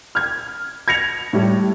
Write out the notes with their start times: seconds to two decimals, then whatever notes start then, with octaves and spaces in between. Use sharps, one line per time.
0.15 F6 G#6
0.88 G#6 A#6 C#7 F7
1.33 A2 G3